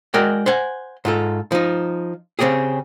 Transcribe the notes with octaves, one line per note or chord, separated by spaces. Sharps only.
G#3 F#4 A#4 D5 G5
C5 F#5 G#5
G#2 F4 A4
F3 D#4
C#3 C4 C#4 G4 G#4